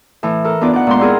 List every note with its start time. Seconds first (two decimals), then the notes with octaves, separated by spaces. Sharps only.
0.23 A2 E3
0.44 A4 A#4
0.61 B3 D4 D#4 F4 D5
0.73 D5 F#5
0.87 A#2 G#3 B3 C6
0.99 C4 E4 G#4 A#4